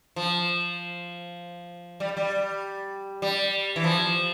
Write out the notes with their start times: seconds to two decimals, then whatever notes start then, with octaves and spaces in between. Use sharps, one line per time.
0.16 F3
2.00 G3
2.17 G3
3.22 G3
3.76 E3
3.84 F3